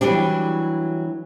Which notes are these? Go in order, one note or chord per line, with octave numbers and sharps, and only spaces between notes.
E3 F#3 G3 D4